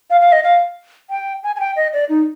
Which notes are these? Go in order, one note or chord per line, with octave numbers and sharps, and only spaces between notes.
F5
F5
D#5
F5
G5
G#5
G#5
G5
D#5
D5
D#4